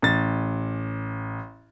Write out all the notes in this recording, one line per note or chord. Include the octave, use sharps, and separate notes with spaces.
A1 A6